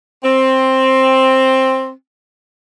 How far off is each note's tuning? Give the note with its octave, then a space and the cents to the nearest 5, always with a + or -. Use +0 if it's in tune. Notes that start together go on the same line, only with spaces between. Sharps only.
C4 +10